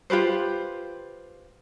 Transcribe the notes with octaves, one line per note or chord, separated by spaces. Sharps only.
F4 G4 B4 C5